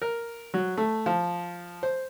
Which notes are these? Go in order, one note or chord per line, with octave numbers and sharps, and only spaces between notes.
A#4
F#3
A3
F3
C5